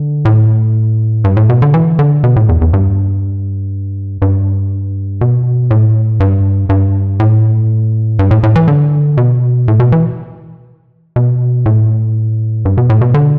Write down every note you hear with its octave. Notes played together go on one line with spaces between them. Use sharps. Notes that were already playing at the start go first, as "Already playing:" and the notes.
Already playing: D3
A2
G2
A2
B2
D3
E3
D3
B2
A2
E2
E2
G2
G2
B2
A2
G2
G2
A2
G2
A2
A2
E3
D3
B2
A2
B2
E3
B2
A2
G2
B2
A2
B2
D3